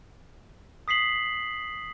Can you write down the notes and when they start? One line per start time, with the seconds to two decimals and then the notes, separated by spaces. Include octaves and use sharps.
0.88 D#6 B6 C7 F#7